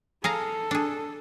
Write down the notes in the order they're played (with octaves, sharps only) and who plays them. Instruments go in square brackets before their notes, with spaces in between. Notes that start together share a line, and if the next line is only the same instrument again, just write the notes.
[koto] G#4 F5 A#5 [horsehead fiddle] A4
[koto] D4 G#4